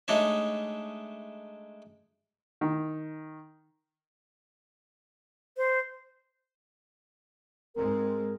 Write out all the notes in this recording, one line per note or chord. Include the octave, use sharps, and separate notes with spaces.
G#3 A3 D4 D#4 C#5 E5
D#3
C5
G#2 G#3 C4 A#4